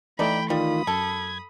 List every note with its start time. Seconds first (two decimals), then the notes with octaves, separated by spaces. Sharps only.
0.19 E3 A3 D#4 D5 G5 B5
0.50 D#3 G3 F4 B5 D#6
0.87 F#2 A4 G#6